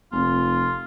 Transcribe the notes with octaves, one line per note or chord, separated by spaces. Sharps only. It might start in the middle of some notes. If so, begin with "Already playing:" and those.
F1 F4